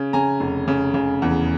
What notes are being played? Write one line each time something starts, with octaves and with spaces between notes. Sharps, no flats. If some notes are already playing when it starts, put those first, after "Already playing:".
Already playing: C#3
C#3 G#5 A#5
F1
C#3
C#3
E2